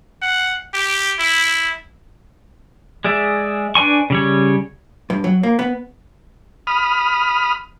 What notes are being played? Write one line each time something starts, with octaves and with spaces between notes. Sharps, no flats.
F#5
G4
E4
G#3 G#4 D5 E5
D4 B4 D5 G#5 C#6
C#3 G3 C#5
G2
F#3
A#3
B3
B5 D#6 F6